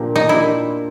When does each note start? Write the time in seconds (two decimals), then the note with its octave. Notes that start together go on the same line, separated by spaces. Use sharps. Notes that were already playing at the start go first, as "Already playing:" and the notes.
Already playing: A#2 F3 A#3 D4 G4
0.16 D#4
0.29 A#2 F3 A#3 D4 E4 G4